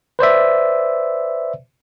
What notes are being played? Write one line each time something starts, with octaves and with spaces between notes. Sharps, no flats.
B4 C5 D5 E5